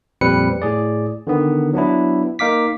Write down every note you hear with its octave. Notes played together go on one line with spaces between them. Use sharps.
F2 A#2 G3 C4 B4 C#7
A2 G#4 D5
D3 D#3 B3
F#3 B3 D4 E4
A#3 D#4 F5 D6 B6